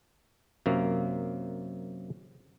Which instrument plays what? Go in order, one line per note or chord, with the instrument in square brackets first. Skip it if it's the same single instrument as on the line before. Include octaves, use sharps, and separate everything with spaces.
[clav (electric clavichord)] F#2 C3 A#3